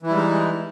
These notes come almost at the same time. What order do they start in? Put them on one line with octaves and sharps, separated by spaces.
E3 E4 G3 G#3 D#4